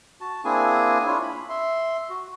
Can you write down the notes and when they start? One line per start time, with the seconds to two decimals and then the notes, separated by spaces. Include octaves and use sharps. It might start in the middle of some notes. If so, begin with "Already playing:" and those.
0.21 F#4 A5
0.45 A#3 C4 D4 E4 G#4 G#5
1.07 D4 E4 F4 C#5
1.23 B5
1.49 E5 C6
2.10 F#4